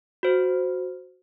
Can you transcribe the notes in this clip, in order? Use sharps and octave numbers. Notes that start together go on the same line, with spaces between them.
F#4 C5